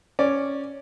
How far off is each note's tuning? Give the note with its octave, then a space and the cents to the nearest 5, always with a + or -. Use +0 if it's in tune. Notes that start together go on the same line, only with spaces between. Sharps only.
C#4 +0 D5 +0